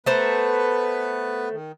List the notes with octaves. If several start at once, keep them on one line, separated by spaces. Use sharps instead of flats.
A3 B3 B4 C5 A#5
D#3